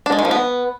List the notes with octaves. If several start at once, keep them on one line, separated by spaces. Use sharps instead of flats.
D4
G#3
D#3
F3
B3